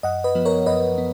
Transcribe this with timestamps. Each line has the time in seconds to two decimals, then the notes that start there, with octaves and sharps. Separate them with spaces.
0.03 F#2 D#5 F#5
0.24 B4 D#5
0.35 F3 B3
0.45 A#4 C#5
0.66 F#2 B4 D#5
0.98 B3